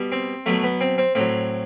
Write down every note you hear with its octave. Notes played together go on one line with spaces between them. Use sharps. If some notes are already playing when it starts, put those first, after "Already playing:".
Already playing: B2 G3
C4
B2 F#3 A3
B3
C4
C4
A2 F#3 C4